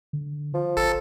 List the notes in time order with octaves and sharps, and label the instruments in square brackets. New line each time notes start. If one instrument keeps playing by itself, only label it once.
[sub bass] D3
[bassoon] F3
[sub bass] G#1 [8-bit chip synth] A4